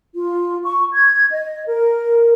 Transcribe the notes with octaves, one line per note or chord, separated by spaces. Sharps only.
F4
C#6
G#6
D#5
A#4